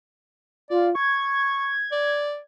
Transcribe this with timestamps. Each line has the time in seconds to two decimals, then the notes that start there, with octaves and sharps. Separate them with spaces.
0.70 F4 D5
0.95 C#6 G#6
1.92 D5